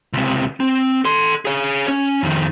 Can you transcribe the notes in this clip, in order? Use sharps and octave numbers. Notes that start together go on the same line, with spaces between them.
C#2 C3
C4
A4 C6
G#4 C#5
C#4
F2 D#3